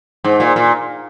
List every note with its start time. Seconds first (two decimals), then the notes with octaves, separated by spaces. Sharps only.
0.24 G#2
0.40 A#2
0.56 A#2